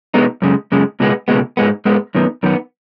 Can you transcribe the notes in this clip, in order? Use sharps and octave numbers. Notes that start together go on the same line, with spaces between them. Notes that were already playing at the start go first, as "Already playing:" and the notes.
B2 G#3 B3 D#4
F#2 C#3 G#3
F#2 C#3 G#3
C#2 B2 G#3 B3
C#2 B2 G#3 B3
G#2 G#3 B3
G#2 G#3 B3
F#2 D#3 B3
F#2 D#3 B3